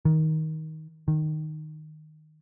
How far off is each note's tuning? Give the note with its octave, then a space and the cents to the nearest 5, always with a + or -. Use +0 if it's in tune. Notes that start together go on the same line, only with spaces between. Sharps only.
D#3 +15
D#3 -10